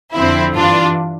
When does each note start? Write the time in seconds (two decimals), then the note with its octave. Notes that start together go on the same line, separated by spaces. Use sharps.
0.15 F2 D3 F3 C4 E4
0.55 G2 E3 D4 F4